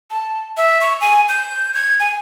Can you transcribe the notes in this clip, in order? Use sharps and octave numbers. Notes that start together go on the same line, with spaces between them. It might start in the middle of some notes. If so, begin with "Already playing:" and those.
A5
E5
C#6
G#5
G6
G#6
G#5